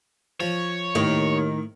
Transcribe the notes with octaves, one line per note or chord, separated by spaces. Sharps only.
F3 C#5
D#2 A2 D#3